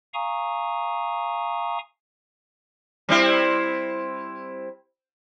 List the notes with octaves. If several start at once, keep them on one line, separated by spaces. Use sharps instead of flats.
F5 G#5 A#5 C#6 D#6
G3 C4 E4